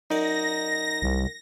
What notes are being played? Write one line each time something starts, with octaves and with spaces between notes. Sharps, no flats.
F#2 D#4 D5 A#6
C2